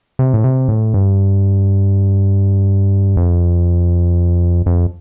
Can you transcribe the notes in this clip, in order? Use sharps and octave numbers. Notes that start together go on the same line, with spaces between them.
C3
A2
C3
A2
G2
F2
F2